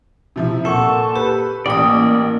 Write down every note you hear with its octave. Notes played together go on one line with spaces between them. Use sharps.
C3 F3 E4
A#2 A4 F#5 C#6
G4 B4
A1 A#3 D5 G5 D#6